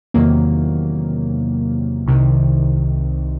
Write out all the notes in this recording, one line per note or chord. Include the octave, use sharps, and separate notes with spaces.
E2 C3 D#3 F#3 A#3
C2 C3 D#3